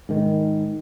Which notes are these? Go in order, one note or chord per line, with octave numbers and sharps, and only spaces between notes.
G#2 D#3